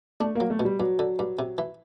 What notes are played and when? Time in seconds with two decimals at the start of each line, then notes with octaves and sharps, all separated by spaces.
0.20 A3 D4
0.35 F#3 A#3
0.50 A3
0.59 B2
0.65 G3
0.80 G2 F#3
0.99 D3
1.19 G2
1.39 C3
1.58 E3